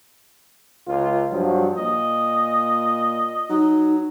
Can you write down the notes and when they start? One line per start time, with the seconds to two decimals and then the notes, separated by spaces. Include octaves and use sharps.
0.88 C#2 F4
1.32 G2 F3 F#3
1.77 A#2 D#5
3.49 F#3 D#4